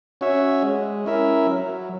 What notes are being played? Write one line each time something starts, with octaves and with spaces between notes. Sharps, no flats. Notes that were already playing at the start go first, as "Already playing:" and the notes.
C#4 F#4 C#5 E5
G#3
C#4 E4 A#4 E5
F#3